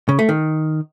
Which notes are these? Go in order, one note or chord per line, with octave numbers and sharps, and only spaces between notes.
C#3
A3
D#3